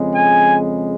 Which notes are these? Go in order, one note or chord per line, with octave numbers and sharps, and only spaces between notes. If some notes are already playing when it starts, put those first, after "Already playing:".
Already playing: F2 C#3 G#3
G#5